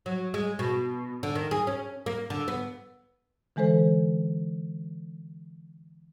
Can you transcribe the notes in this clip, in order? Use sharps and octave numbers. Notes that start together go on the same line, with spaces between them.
F#3
G#3
B2
D3
D#3
G#4
C#4
A#3
D3
B3
D3 E3 G#3 A4 C5